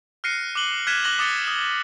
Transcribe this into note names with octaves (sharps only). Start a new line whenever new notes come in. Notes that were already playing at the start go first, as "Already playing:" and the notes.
F6 F#6 A#6 C7 C#7 D#7
D6 F#6 F#7 G7
F6 F#6 G#6 B6 D#7 E7
D6 F#6 A#6 F#7 G7
D6 D#6 A6 C#7 G7
D#6